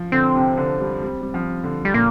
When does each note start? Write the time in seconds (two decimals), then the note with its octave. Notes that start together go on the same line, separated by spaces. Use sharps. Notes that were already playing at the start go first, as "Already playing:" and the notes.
Already playing: F3
0.12 D3 C4
0.35 C3
0.57 D3
0.80 G3
1.02 G3
1.21 G3
1.34 F3
1.64 D3
1.85 G3
1.94 A#2 A#3